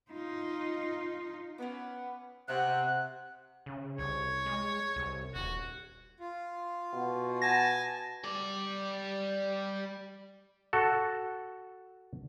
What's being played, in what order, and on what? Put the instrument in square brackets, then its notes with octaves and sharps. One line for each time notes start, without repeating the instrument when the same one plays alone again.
[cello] D#4 F4
[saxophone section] B3 [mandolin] C#4 B5 D6
[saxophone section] C3 [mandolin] B3 F#4 [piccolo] F#6
[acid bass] C#3
[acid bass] C2 [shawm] C#5
[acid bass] G#3
C2
[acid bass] D#1 [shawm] F#4
[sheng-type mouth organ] F4
[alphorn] B2
[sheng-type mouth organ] G#5 A5 [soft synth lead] A#6
[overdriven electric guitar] G3 D5
[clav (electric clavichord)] F#4 A4